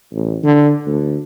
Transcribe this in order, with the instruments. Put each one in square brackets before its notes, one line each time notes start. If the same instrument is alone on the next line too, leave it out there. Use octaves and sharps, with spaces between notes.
[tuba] A1
D3
D2